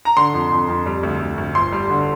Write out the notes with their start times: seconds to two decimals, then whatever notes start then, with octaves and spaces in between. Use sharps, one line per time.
0.05 A#5
0.17 D3 C6
0.34 F2
0.51 F2
0.69 F2
0.86 G3
1.03 D2
1.21 D2
1.38 D2
1.55 G1 C6
1.72 G3
1.90 D3